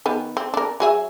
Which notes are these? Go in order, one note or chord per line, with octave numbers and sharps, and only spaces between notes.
D#3 B3
C4
D4 A#4
F#3 G#4 E5